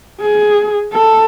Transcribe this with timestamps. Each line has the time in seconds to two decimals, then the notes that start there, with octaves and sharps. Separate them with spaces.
0.20 G#4
0.93 A4